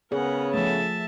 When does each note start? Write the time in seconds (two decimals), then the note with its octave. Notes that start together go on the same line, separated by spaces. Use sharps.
0.12 C#3 B3 G#4 A#4 C#5 F#5
0.54 F3 A3 E5 A5